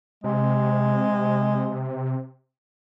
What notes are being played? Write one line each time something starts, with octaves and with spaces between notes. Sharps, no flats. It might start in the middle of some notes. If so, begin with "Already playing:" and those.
C3 G#3